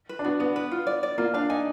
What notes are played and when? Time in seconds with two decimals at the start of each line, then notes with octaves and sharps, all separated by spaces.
0.09 B4
0.19 D4
0.24 B3 F#4
0.40 B3 F#4
0.56 B4
0.72 F4
0.87 D5
1.03 D5
1.18 A#3 F4
1.34 D4 F5
1.49 D#4 G#5